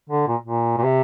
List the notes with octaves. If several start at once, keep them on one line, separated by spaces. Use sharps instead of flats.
D3
A#2
A#2
A#2
C3